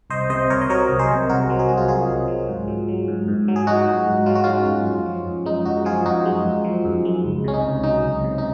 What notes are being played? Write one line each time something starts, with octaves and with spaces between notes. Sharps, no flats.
C2 C5 D#5
C3 C5 D#5
C2 A#4 C#5
D#5
F#3 A#4 C#5
C2
G#4 C5
C3
C2 F#4 A#4
F#3
G#4
C2 F#4
F4 G#4
C3 F4 G#4
C2
F#3
G#2
F#3
F#3
G#2
G#2
F#3
G#4
F#3 D#4 F#4
G#2
G#2
F#3 F4
F#4
F#3 C#4 F4
G#2
F#2
F3
F#2
G#3 D#4
F#2 D#4 F#4
F3 F4 G#4
F#2 D#4 F#4
G#3
F#2
F3
F#2
G#3
C#2
C3 C#4
D#4
C#2
F#3 D#4
C#2
C3
D#4